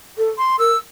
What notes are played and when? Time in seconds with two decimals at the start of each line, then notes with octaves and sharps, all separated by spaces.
0.18 A4
0.38 C6
0.59 A#4 E6